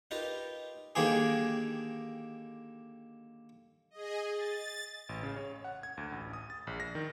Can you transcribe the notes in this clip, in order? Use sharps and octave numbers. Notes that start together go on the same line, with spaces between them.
D#4 F4 G4 A#4 B4 D#5
D3 D#3 A#3 G4 G#4
G#4 D#5
A6
A1
C#3
C#5
F#5
G#6
D2
A1
D#6
A6
A#1
A#6
D#3